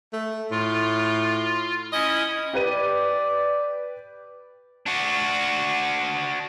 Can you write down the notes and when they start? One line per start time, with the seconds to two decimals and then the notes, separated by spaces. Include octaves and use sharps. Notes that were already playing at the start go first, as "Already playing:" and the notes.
0.13 A3
0.51 A2 F4
1.93 C#4 E4 D#5
2.53 G4 B4 D5 D#7
4.86 D4 F#4